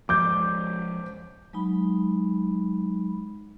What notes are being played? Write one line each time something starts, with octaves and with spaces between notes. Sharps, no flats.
F3 G#3 D6 G6
F#3 G#3 D#4 B5